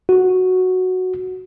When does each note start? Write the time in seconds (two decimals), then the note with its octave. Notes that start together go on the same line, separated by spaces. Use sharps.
0.09 F#4